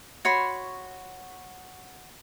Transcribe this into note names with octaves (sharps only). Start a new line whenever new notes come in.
F#4 C#5 B5 C6